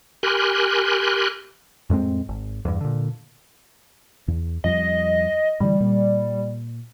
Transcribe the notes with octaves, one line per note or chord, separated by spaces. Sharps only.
G4 A#4 G#5 B5 C6 F#6
F2 A2 G#3 C4
G#1
E2 G2
A#2 D3
E2
F2 F3 G3 D#5
A2 D3 E3 G3
A#2